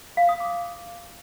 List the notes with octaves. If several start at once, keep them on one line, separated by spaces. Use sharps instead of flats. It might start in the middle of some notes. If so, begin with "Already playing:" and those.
F5
D#6
D6